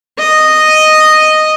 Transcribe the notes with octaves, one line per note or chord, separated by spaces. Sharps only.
D#5